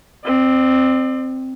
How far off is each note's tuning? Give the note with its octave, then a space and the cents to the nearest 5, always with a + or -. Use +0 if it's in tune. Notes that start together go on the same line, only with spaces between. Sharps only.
C4 +0 D5 +40